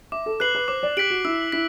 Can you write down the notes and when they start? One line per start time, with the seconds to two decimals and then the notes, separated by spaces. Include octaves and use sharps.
0.12 E5 D6
0.26 A4
0.40 B4 F#6 C7 F#7
0.55 B4
0.68 C5 D6
0.83 D5
0.97 G4 F#6 B6 D7 F#7
1.10 F#4
1.25 E4 E6
1.52 E4 B6